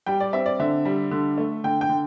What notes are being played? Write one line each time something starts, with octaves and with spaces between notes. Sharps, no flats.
G3 G5
D5
C4 E5
D5
D3 E5
G3
D3
A3
D3 G5
G5
D3